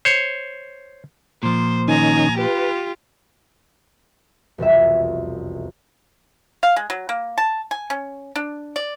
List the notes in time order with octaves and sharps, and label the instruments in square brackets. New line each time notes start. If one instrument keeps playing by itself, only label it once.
[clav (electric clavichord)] C5 C#5
[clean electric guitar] A#2 F3 [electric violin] C5
[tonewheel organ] D#3 C#4 D#4 [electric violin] G#5 A#5
[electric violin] F4 G4 [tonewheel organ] B4
[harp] E1 C2 F2 E5
[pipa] F5
G#3
F#3
A#3
A5
G#5
C#4
D4
D5